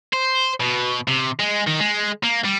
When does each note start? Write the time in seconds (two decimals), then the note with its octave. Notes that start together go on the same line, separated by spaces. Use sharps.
0.13 C5
0.60 B2
1.08 C3
1.40 G#3
1.67 D#3
1.80 G#3
2.23 A#3
2.45 G3